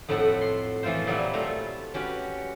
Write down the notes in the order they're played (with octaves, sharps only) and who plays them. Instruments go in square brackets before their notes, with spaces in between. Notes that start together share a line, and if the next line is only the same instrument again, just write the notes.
[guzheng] F2 A2 A3 E4 F#4 F#5
C6
E3 F3 A3 F4 C5
A#2 F#3 G3 A#3 E4
A3 F4 A#5
C#4 F#4 G4 B4